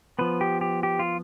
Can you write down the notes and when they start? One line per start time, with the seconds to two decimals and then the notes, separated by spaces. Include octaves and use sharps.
0.19 F3 B3 B4
0.41 G4
0.61 G4
0.83 G4
0.99 F4